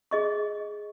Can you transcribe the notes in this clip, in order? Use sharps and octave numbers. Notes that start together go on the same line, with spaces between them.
G#4 D#5 C#6